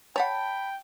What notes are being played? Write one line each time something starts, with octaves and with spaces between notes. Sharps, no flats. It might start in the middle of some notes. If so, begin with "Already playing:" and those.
C#5 F#5 G5 A5 B5